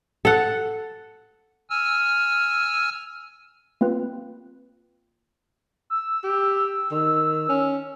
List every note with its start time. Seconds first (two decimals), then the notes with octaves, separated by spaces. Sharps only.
0.25 A4 F#5
1.70 G#5 E6 F6
3.81 A#3 C4 F4 B4
5.90 E6
6.24 G4
6.91 D#3
7.49 C#4